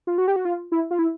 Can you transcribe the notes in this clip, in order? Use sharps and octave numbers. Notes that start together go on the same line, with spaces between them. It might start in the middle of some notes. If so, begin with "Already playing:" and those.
F4
F#4
G4
F#4
F4
E4
F4
E4